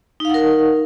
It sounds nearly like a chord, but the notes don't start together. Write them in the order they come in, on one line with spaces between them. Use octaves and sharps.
D#4 F5 F#5 A#4